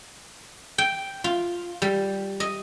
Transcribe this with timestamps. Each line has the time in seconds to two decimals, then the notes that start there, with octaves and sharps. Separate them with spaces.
0.78 G5
1.24 F4
1.82 G3
2.40 D#5